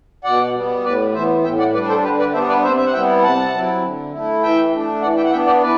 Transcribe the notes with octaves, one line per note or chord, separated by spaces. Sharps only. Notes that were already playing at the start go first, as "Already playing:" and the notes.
B2 D5 F#5
G3 B3
A2 B4 D5
E3 C5 E5
B3
A2 E5 G5
D5 F#5
G3 D4 B4 D5
A4 C5
D3 G4 B4
B4 D5
G3 B3 D4 C5 E5
B4 D5
C3 C5 E5
E5
F#5
G3 B3 E4 E5 G5
C3 F#5 A5
F#3 C4 E4
D3
A3 E4
E3 E5 G5
A3 D4
E3 D5 F#5
E5 G5
F#5
B3 D4 E5 G5
D5 F#5
E3 B4 D5